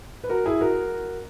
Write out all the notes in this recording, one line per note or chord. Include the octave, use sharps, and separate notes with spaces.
B4
F#4 A#4
E4 G#4
F#4 A#4